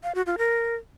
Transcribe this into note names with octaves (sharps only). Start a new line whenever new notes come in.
F5
F#4
F4
A#4